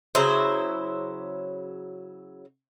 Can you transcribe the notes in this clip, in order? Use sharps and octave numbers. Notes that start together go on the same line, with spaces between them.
C#3 F#3 E4 C5